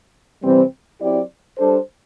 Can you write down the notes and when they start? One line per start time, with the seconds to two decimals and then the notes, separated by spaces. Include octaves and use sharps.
0.43 C3 E3 G3 C4
1.01 F#3 C4 E4 G4 D5
1.58 G3 D4 A4 C5